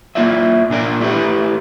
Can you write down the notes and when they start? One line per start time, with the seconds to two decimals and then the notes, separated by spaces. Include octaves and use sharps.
0.15 A#3 E4 F4 C5 D5 E5
0.70 A#2 D4 A#4 D5
1.00 A3 E4 G4 A4 B4